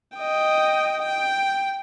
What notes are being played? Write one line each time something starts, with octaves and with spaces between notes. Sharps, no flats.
D#5 G5
G5